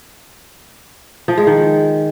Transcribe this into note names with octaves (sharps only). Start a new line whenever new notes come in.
F3
G#3
D#3